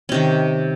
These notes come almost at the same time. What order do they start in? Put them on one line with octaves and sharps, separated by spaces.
C#4 C3 D#3